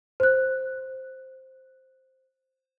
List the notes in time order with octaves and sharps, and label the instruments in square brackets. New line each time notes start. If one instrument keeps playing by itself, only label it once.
[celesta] C5 F#6